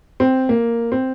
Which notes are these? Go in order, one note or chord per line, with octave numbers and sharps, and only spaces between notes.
C4
A#3
C4